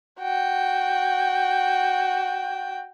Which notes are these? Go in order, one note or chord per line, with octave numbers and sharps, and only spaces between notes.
F#4 G5